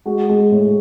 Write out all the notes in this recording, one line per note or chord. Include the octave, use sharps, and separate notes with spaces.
G#3 F#4
G#3
A2